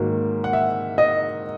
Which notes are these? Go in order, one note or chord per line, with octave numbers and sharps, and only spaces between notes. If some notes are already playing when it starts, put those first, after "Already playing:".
Already playing: G#2 D#3 F#3 A#3
F#5
E5
D#5